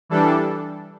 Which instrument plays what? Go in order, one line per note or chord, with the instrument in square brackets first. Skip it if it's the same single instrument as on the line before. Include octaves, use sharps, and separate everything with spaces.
[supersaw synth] E3 G3 D4 A4